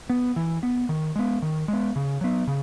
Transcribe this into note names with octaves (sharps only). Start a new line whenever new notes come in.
B3
E3
B3
D#3
G#3 B3
D#3
G#3 B3
C#3
F#3 B3
C#3